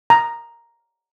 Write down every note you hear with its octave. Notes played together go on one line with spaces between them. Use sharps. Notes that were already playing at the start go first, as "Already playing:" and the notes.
A#5